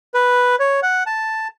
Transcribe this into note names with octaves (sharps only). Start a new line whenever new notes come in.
B4
C#5
F#5
A5